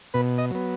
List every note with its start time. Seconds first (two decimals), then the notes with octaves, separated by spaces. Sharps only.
0.14 B2 B4
0.38 D#5
0.51 F#3 B3